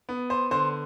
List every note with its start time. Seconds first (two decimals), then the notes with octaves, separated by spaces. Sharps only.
0.09 B3
0.30 C5
0.51 D3 C5